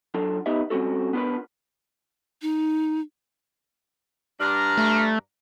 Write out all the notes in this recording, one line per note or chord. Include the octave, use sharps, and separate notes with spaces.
F#3 D4 F4 A4
B3 D#4 G4 B4 D#5 E5
G3 C4 C#4 F#4 A4
B3 D4 F4 G#4 A#4 B4
D#4
G2 D4 A#5 F6
A3